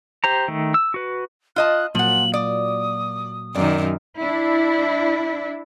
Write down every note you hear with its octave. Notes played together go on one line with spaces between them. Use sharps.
G4 C5 A#5
D#3 A3
E6
F#4 B4
F4 D#5 A5 F#6
A#2 F3 F#3 A#3 F#5 F#7
D5 D#6
F#2 D#3 D5
D4 E4